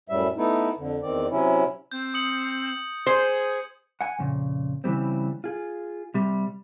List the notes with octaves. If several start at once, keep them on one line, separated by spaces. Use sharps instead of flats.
F#2 A2 G3 E5
A3 B3 D#4 E4
F2 D3
E2 D#3 C4 D5
C3 F#3 C#4 E4
C4 G6
D#6 C#7 F#7
G#4 C5
F#5 G#5
F2 A#2 C#3
C#3 E3 F#3 G3 C4
F4 G#4
C3 G3